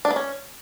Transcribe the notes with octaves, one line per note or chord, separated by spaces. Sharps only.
D4
B3
C#4